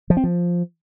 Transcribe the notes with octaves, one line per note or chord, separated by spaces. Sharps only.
F3
C4
F3